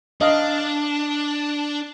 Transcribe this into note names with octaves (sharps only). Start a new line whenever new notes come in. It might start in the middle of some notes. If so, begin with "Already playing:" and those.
D4 D#5 F5